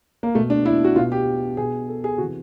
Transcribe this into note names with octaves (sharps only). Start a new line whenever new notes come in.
A#3
B2 A3
D4
E4
F#4
B2 F4
G4
B2 G#4
A4
G#4
C3 E3 F#4